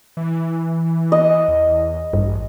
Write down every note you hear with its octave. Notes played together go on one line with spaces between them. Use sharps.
E3
D#5
E2
A1 G2